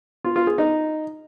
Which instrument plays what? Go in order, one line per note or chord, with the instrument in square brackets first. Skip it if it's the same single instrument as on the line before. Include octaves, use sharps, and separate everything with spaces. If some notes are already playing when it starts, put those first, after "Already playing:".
[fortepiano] F4
F4
G#4
D#4